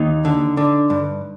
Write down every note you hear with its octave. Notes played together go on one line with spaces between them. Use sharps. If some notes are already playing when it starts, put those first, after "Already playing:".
Already playing: D#2 D#4
D3
D3
G2